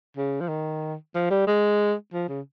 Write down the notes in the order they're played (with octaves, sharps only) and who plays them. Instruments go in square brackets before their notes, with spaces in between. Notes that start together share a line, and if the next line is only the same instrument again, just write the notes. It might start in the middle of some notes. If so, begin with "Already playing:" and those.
[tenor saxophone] C#3
F3
D#3
F3
G3
G#3
F3
C#3